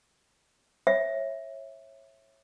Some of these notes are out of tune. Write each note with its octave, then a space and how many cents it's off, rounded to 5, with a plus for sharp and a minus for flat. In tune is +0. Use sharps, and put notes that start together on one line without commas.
C#5 -25 E5 +0